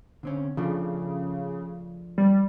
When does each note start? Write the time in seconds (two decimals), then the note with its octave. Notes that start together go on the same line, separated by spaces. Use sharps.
0.23 D3 C4 C#4
0.57 C#3 F3 A3 D4
2.18 G3